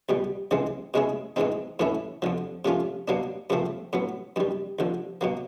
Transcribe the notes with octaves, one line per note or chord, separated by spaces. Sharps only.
C#2 B2 G3
C#2 C#3 E3 G#3 C4
B2 G#3 C#4 E4 G#4
G#2 E3 G#3 C4 D#4
A2 E3 A3 C#4 E4
F2 D3 F3
C3 F3 A3 C#4 F4
B2 F#3 A#3 D4
F#2 C#3 F3 A3 C4
A2 F#3 B3
F#2 D#3 G3
D#2 D3 F3
B2 F#3 A#3